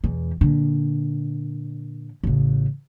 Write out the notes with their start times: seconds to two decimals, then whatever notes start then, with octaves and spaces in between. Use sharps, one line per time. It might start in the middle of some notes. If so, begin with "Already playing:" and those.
0.04 E2 B2
0.41 A#2 D3
2.24 A1 C#3